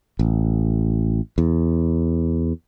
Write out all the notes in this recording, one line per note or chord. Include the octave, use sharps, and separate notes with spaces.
A1
E2